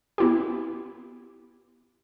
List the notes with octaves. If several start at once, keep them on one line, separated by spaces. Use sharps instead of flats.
B3 E4 G4